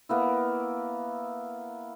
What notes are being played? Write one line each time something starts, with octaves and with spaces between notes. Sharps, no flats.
A#3 B3 E4